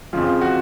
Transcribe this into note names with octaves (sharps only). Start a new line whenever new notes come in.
F2 C#3 F3
F#4